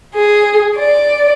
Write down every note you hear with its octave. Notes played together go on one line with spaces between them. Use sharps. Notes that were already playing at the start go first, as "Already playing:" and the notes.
G#4
D5